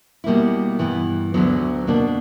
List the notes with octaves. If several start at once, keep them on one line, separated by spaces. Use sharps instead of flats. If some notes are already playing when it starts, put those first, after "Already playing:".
B2 G3 A#3 E4
G2 E3 B3
D2 D3 F#3 B3
B2 A#3 D4